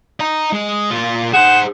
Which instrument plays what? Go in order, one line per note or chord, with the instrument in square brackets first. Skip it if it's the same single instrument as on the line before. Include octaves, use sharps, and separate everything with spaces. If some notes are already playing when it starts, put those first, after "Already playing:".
[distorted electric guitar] D#5 A#5
G#3
A#2 F4
[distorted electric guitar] G#4 C5 [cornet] F#5 [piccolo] E7